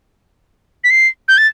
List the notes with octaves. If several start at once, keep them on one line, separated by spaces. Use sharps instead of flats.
B6
C7
G6
A6